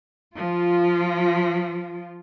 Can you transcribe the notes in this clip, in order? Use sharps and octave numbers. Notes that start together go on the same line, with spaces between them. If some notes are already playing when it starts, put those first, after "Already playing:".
F3 F4